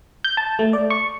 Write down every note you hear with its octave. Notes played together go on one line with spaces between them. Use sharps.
G6
A5
A3
D5
C#6